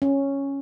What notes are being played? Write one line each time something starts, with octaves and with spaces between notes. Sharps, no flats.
C#4